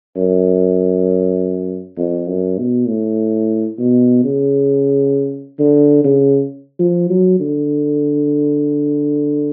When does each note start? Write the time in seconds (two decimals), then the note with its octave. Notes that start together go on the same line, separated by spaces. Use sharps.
0.16 F#2
1.97 F2
2.27 F#2
2.58 B2
2.87 A2
3.78 B2
4.23 C#3
5.59 D3
6.04 C#3
6.79 F3
7.10 F#3
7.40 D3